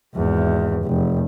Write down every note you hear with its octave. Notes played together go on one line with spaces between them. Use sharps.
G#1 E2
F1